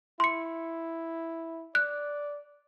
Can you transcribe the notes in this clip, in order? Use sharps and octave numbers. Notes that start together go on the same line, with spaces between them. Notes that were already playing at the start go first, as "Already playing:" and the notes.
E4 C6 C#7
D5 F#6